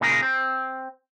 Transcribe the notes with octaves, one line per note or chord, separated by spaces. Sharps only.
A#2 C#3 D#4 G#4 A#4
C4